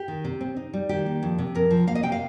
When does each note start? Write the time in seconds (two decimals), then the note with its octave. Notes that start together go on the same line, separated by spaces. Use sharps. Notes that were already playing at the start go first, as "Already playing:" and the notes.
Already playing: G4
0.08 D#3
0.25 C3
0.41 C4
0.56 D#4
0.74 G3
0.89 D#3 G4
1.06 A#3
1.23 F2
1.38 C3
1.55 F2 A#4
1.71 F3
1.87 A#3 F5
1.95 D#5
2.03 C3 G5
2.12 F5